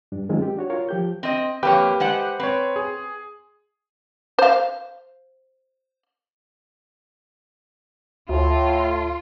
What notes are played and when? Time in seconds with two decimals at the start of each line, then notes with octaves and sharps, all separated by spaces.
0.12 G2 D4
0.29 D#3 F#3 G#3 C4 C#4 F4
0.42 G4
0.57 D4 F#4 C#5
0.70 F4 A#4 C#5 F5
0.89 F3 G4 G6
1.23 C4 D#5
1.63 F2 A#3 G4 B4 C#5 G5
2.00 G#3 C5 F#5
2.40 C4 B4 C#5
2.76 G#4
4.39 C5 F5
8.29 D2 A2 F4